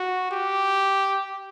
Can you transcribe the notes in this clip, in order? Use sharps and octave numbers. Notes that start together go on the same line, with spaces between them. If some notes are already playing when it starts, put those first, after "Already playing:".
Already playing: F#4
G4